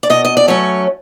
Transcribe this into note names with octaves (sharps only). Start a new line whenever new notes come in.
D5
B2 D#5
D#5
D5
F#3 A3 C#4 C#5